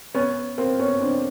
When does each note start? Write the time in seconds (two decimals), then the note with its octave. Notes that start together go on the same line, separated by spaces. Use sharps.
0.15 B3 C#4
0.58 A#3 C4
0.79 B3 C#4
1.00 C4 D4